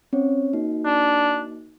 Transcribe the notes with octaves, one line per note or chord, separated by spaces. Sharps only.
C4 C#4 C#5
A#3 D#4 F#4
D4